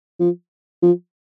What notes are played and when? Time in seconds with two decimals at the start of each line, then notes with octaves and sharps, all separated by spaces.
0.20 F3
0.82 F3